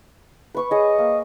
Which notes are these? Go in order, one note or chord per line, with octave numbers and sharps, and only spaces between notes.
B4 C#6 D6
G#4 C#5 D#5
A#3